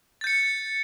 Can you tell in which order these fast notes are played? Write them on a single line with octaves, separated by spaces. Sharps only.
A6 G6 C#7